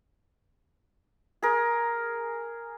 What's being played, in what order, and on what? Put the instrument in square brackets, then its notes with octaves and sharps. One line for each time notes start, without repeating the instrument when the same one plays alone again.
[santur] G#4 A#4